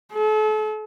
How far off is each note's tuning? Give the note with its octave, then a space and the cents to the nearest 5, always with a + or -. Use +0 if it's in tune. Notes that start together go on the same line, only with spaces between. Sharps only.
A4 -40